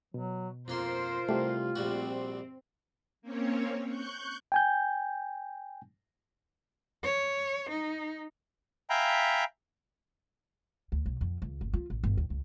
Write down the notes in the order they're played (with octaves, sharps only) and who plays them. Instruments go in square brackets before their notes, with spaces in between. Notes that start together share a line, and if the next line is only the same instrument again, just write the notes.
[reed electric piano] B2 [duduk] F#3
[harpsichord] F2 A#3 C6 [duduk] F4 [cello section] A#4 C5
[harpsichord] C2 [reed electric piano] A3 G4
[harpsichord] A#1 G3 F#4 [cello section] C4
[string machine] A#3 C4 C#4 C#5
C#6 F#6 G6
[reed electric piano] G5 G#5 G6
[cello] C#5
D#4
[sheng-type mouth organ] E5 F5 G5 G#5 A#5 B5
[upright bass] D2
B1
F2
C#2
F#1
F4
A1
G1
D#2
C#2